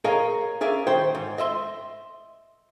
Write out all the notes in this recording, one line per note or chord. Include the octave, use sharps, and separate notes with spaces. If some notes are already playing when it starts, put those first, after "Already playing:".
G#4 A#4 C#5 D#5 F5 A#5
C#4 G#4 A#4 D5 E5 F5
D#3 C5 C#5 G5
G#2
D#5 E5 C6